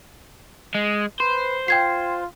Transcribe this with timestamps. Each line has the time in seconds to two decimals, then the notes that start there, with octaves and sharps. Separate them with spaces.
0.74 G#3
1.20 B4 C5
1.68 F4 G5 G#6 C7